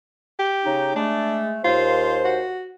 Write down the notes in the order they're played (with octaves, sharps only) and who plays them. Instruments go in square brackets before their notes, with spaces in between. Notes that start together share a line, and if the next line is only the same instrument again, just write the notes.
[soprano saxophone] G4
[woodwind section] C#3 D#4
[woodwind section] G#3 A3 [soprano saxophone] D4
[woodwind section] D#2 C5 [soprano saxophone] F4
[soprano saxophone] F#4